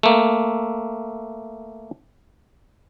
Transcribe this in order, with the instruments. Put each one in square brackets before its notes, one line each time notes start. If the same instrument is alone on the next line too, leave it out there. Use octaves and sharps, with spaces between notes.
[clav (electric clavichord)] A3 A#3